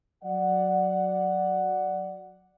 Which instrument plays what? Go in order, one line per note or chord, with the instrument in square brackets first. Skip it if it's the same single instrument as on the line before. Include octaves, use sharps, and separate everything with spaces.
[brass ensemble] F#3 D5 F#5